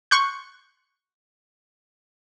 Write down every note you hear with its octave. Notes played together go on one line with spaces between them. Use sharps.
C6 C#6 F#6 G6